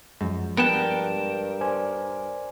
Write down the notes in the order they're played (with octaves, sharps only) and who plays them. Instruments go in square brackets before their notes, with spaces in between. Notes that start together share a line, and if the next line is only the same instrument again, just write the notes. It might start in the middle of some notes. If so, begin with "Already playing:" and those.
[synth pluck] F#2 [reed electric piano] F3 G#3
[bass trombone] G2 [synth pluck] B3 F#6 [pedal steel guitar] A#4 G5 A5
[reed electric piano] C5 D5 G#5